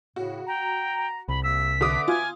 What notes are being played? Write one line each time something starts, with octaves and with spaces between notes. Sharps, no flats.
A2 C#3 F#4
G5 A#5
C2 B5
C3 A#3 E6 B6
D3 B4 E5 D6 D#6
F4 G#5